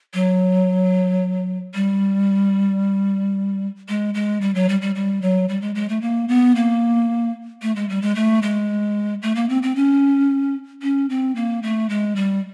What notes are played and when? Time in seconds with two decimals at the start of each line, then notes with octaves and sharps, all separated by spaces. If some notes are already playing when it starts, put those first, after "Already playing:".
0.14 F#3
1.75 G3
3.89 G#3
4.14 G#3
4.41 G3
4.55 F#3
4.69 G3
4.82 G3
4.95 G3
5.22 F#3
5.49 G3
5.62 G#3
5.75 G#3
5.89 A3
6.02 A#3
6.29 B3
6.56 A#3
7.62 A3
7.76 G#3
7.89 G3
8.02 G#3
8.15 A3
8.42 G#3
9.22 A3
9.35 A#3
9.49 C4
9.63 C4
9.76 C#4
10.82 C#4
11.10 C4
11.36 A#3
11.63 A3
11.90 G#3
12.16 G3